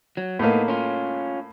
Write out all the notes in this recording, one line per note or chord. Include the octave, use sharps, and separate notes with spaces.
F#3
A2 A#3 B3 D#4
C#4 F4